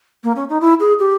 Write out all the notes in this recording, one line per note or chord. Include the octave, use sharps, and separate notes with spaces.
A#3
C#4
D#4
E4
G#4
G4